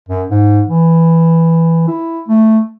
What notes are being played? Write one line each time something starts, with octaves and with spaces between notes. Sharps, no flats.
F#2
G#2
E3
E4
A3